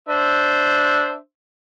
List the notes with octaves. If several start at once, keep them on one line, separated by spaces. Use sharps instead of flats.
D4 C5 E5